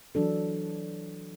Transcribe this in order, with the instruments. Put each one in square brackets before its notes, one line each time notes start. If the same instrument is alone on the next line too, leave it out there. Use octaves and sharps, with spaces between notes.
[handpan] E3 F#3 D4 A4